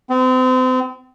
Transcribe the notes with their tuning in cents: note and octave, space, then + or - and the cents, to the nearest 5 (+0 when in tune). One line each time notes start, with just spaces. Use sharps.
C4 -35